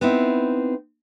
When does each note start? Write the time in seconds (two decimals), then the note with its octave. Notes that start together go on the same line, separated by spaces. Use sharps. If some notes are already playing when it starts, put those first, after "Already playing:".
0.01 B3 C4 D#4 E4